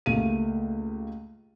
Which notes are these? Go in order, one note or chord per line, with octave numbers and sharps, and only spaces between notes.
C#2 A3 A#3 G4 F5 D#7